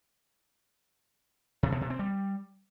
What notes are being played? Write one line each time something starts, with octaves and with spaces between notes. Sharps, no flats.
C3
B2
C3
C4
G3